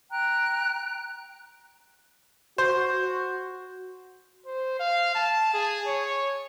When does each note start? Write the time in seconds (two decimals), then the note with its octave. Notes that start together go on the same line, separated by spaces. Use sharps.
0.11 G5 A#5 F#6
2.58 F#4 C5
4.46 C5
4.80 F5
5.15 A5
5.54 G#4
5.87 C#5